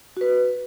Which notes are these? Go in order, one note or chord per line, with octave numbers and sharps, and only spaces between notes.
F#4 B4